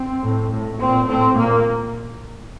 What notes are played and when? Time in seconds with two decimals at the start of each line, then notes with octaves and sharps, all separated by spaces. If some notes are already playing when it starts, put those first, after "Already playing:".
Already playing: C4
0.21 A2
0.51 A2
0.78 A#2 C4
1.07 A2 C4
1.35 A#2 A#3